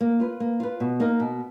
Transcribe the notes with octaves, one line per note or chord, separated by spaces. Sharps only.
A#3
F4 B4
A#3
F4 B4
B2
A#3 D#4 A#4
B2